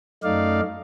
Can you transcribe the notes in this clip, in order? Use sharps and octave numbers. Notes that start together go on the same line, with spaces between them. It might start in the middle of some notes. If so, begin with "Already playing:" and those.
F#2 A3 D#4 D5 F5